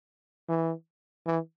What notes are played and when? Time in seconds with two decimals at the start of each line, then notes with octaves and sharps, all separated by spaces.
0.49 E3
1.27 E3